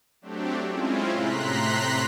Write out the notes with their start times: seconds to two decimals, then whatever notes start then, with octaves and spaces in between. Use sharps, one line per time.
0.21 F#3 A3 C4 D4 G4
0.65 G#3 C4 C#4 E4 F4
1.11 A2 C3 A#5 C6 F#6 B6